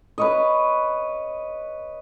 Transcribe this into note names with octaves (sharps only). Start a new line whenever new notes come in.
B4 C#5 D#5